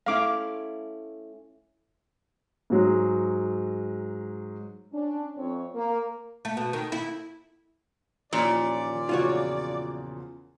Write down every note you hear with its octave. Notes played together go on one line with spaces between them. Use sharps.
A3 C#4 E4 F5 D6
G#2 F#3 G#3
C#4 D4
F2 C4 C#5
A#3
A3
B2
D#3
E4
D#2 A#2 E3 F3 C#4 D5
E2 C#3 F3 F4 F#4 C#5